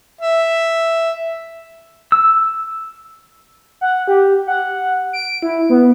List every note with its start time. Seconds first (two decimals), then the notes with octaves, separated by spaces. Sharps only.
0.21 E5
2.12 E6
3.81 F#5
4.08 G4
4.47 F#5
5.13 D7
5.42 E4
5.69 B3